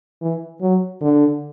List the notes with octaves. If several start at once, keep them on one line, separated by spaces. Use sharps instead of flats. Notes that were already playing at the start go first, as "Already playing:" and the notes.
E3
F#3
D3